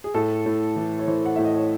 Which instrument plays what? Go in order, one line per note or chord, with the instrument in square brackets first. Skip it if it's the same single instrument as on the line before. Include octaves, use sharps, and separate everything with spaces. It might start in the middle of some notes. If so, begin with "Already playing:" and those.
[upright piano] G#4
A2 A4
A2
E3
C#5
E3 C5
F#5
A2 E5
D#5
C#5